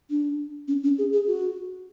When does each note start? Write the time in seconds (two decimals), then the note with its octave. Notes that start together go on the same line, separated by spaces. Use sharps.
0.10 D4
0.68 C#4
0.83 C#4
0.98 G#4
1.13 G#4
1.27 F#4